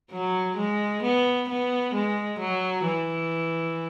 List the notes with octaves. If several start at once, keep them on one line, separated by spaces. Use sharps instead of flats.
F#3
G#3
B3
B3
G#3
F#3
E3